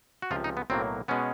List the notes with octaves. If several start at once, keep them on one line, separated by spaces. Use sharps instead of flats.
F#4
C#2 C3 F3 F4
D#4
B3
B1 A2 F#3 A#3 C4
B2 G#3 B3 C#4